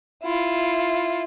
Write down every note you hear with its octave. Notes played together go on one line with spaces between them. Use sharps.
E4 F4